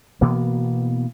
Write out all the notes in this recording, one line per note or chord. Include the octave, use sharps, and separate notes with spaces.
B2 E3 A#3 B3